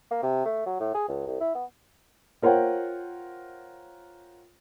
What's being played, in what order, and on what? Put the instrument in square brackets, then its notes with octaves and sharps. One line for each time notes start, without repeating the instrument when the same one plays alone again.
[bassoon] A#3
C3
A3
F#3
A2
G#4
C#2
C2
E4
B3
[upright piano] F4 A#4 C5 C#5 F#5 G5